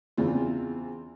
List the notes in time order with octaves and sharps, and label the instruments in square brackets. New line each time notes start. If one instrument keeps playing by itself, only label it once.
[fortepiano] E2 C#3 E3 C4 F4